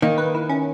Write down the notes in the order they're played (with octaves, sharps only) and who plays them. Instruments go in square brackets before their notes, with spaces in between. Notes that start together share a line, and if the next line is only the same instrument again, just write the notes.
[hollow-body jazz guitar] D#3 [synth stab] A#3
[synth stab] B4
E4
C#4